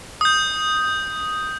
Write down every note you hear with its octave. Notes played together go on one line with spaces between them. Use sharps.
D#6 G6